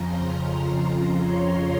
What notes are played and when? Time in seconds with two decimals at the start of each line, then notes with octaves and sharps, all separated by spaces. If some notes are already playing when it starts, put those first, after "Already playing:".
Already playing: F2 C#3 F3 A#5 C6
0.36 A#5
0.78 A#5
1.21 C#5